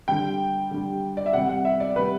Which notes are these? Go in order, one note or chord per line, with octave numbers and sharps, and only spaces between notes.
D3 G3 G5
D3 G3
D5
E5
C3 G3 F#5
F#5
E5
D5
C3 G3 B4